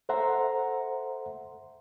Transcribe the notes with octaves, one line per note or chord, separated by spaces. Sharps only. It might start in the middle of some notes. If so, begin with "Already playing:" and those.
A4 C5 E5 F#5 A#5 C6